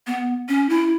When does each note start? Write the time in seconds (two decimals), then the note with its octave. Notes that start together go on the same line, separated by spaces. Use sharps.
0.07 B3
0.49 C#4
0.69 E4